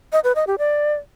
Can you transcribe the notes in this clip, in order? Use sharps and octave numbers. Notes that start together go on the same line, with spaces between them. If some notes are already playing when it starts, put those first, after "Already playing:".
D#5
B4
D#5
G4
D5